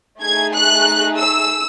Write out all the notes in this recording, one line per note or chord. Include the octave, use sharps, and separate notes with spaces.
A3 D#4 G#4 G#6
F#6
E6